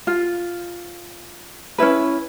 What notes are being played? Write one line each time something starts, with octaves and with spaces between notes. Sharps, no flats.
F4
C#4 D4 E4 B4